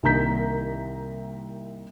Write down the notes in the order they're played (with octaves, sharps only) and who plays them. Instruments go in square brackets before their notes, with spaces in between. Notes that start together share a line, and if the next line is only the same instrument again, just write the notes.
[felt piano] C2 D#3 A#3 A#5 G6 B6